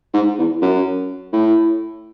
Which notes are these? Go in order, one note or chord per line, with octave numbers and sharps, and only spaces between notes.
G#2
E2
F#2
A2